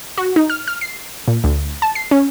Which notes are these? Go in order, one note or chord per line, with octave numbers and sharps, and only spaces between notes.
F#4
D#4
F6
F6
C7
A#2
D2
A5
C7
C#4